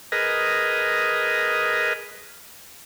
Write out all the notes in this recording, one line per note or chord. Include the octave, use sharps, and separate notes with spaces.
G#4 A#4 B4 D#5